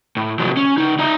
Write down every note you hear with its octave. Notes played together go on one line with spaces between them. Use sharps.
A2
A2 C3 F3 F#3
C#4
C#3 D#4
D#4 E5 A#5